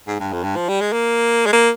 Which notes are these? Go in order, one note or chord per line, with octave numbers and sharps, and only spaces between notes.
G#2
G2
F2
G2
F3
G3
G#3
A#3
G#3
A#3